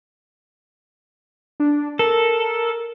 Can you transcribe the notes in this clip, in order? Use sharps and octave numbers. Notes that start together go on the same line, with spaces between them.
D4
A4 A#4